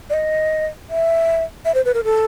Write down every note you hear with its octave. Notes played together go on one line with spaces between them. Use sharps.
D5
D#5
E5
E5
C5
B4
A#4
A4